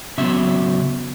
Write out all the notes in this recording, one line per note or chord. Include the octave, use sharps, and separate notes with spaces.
C#3 F#3 B3 E5